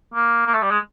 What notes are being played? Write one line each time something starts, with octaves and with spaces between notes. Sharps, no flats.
A#3
A#3
A3
G3
G#3